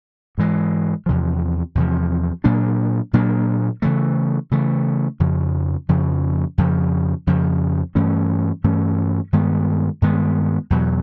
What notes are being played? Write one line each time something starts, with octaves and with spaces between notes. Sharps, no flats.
G#2 E3 G#3
E2 C3 F3
E2 C3 F3
A#2 F#3 A#3 D4
A#2 F#3 A#3 D4
C#3 E3 A3
C#3 E3 A3
F2 C#3 F3
F2 C#3 F3
F2 C#3 F3
F2 C#3 F3
G2 E3 A3 C#4
G2 E3 A3 C#4
G2 D#3 G#3 B3
G2 D#3 G#3 B3
E2 B2 F#3